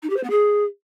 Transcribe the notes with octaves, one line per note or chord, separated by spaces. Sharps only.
D#4
G4
C5
B3
G#4